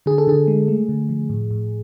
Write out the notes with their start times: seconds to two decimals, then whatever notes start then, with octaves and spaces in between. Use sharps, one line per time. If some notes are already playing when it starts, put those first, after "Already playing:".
0.06 D3 G#4
0.18 A4
0.27 D3 G#4
0.48 G#3
0.68 A3
0.89 D3
1.09 F3
1.30 A2
1.51 A2